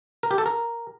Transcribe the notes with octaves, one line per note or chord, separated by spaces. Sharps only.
A#4
G4
A4
A#4